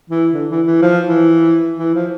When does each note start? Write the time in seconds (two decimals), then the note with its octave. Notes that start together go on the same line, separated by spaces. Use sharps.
0.10 E3
0.34 D3
0.50 E3
0.66 E3
0.82 F3
1.06 E3
1.78 E3
1.95 F3